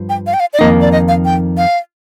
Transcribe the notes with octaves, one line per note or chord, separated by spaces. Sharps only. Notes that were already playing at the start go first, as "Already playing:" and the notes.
Already playing: G2 F3
G5
F5
G5
F5
D5
F2 D#3 A#3 D#4 D#5
D5
D#5
F5
G5
F5